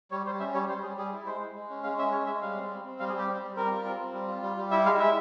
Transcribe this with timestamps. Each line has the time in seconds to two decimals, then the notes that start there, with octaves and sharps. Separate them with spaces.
0.11 G3 C#5
0.26 G3 C5
0.40 C#4 E5
0.54 G3 C#5
0.69 G3 C5
0.83 G3 G#4
0.97 G3 G#4
1.12 E4
1.26 G#3 C5
1.40 G#3
1.55 G#3
1.70 C#4
1.83 G#3 F5
1.98 C#4 E5
2.12 G#3 C#5
2.26 G#3 E5
2.41 G3 F5
2.56 C4
2.70 C4
2.85 C4
2.99 G3 F5
3.09 G#4
3.13 G3 G4
3.27 C4
3.42 G3
3.56 G3 A#4
3.71 F4
3.85 C4
3.99 C4
4.13 G3
4.28 F4
4.42 G3
4.57 G3
4.71 E4 E5
4.86 G#3 F5
5.00 E4 E5